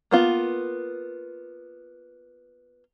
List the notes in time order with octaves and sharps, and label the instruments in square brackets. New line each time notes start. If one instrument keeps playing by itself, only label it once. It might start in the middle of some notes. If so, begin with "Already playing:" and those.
[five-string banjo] A#3 B3 F4